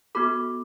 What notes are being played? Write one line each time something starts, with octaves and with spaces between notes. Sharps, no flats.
B3 F#4 A4 B5 D6